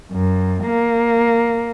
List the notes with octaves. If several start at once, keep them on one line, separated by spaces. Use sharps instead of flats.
F#2
A#3